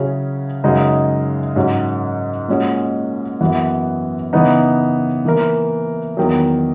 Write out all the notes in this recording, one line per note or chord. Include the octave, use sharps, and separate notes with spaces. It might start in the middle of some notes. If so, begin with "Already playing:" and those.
Already playing: C#3 F#3 C#4 E4 G#4
F#2 C#3 G#3 D#4 F#4
G#2 F#3 C#4 F#4
A#2 G#3 C#4 F#4
F#2 E3 B3 F#4
C#3 E3 B3 D#4
E3 A#3 E4 A#4
E2 D#3 F#3